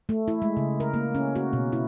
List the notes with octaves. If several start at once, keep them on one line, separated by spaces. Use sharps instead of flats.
A3
E4
G#3
C#3
A#4
A#3
C#4
F#4
B2
E4